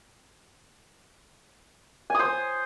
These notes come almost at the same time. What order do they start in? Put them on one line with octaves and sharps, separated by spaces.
G#5 D#6 C5